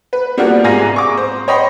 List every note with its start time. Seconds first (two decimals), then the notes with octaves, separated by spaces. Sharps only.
0.13 B4
0.37 G3 A#3 B3 D4 F4 F#4
0.64 G#2 C3 F5 G#5 A#6
0.96 C#6 D6
1.18 C5
1.48 C#5 D#5 G5 B5 C6